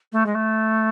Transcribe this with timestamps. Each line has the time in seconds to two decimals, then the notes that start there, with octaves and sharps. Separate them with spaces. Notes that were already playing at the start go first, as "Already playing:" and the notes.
0.12 A3
0.26 G#3
0.35 A3